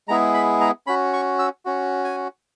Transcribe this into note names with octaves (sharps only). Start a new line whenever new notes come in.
G#3 B3 E4 G#4 A#5
B5
A#5
C#4 F#4 B5
C#6
E6
C#4 F#4
G#5